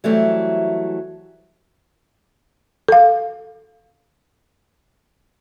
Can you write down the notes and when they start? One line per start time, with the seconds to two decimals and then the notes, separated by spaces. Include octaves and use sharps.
0.04 E3 F#3 G3 A3 C4
2.89 A4 F5